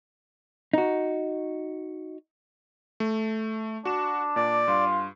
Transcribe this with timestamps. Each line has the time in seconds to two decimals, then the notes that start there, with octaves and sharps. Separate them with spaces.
0.73 D#4 F#4
3.00 A3
3.85 D4 F#4 E7
4.36 A#2 D5
4.68 G2 F4